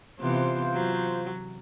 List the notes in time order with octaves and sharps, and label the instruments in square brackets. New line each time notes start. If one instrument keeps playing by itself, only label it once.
[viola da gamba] C3 E3 B3 [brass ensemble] F4 C5
[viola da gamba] F#3